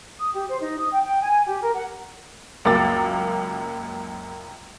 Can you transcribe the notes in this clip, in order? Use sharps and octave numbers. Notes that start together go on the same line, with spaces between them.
D#6
G4
C5
D#4
D#6
G5
G5
G#5
G4
A#4
F#5
C#2 F#2 A#3 D6 A6